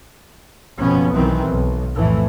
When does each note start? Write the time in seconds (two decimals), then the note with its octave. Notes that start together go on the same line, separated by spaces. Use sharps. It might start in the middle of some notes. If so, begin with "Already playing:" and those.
0.79 F#1 F2 B2 F3 B3 C#4
1.12 B1 D#3 E3 C4
1.46 B1
1.95 F2 A2 E3 A3